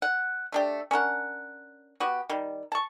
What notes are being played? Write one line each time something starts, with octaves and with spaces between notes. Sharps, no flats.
F#5
A3 D4 G4
C#4 D4 A#4 F#5
B3 F#4 G4
D#3 G3
A5 C#6